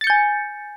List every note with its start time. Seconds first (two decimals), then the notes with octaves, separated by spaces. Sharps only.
0.01 A6
0.04 C#7
0.07 G6
0.10 G#5